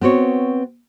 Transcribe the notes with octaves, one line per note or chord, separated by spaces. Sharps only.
B3 C4 F#4 C#5